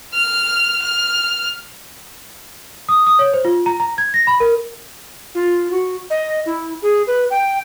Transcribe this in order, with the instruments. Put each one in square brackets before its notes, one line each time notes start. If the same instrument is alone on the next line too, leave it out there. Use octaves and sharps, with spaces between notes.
[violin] F6
F6
[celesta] D#6
D#6
C#5
C5
F4
A#5
A#5
G#6
A#6
B5
A#4
[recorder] F4
F#4
D#5
E4
G#4
B4
G5